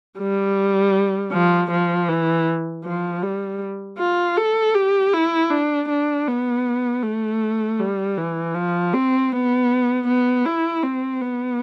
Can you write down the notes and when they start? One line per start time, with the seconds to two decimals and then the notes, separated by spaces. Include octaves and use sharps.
0.19 G3
1.32 F3
1.71 F3
2.09 E3
2.84 F3
3.22 G3
3.98 F4
4.37 A4
4.74 G4
5.13 E4
5.50 D4
5.88 D4
6.27 B3
7.03 A3
7.80 G3
8.17 E3
8.55 F3
8.93 C4
9.32 B3
10.07 B3
10.46 E4
10.83 C4
11.21 B3